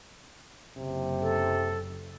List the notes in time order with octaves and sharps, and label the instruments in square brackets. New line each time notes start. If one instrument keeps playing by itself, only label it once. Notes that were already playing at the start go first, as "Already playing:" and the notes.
[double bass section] F#1 [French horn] C3
[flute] A4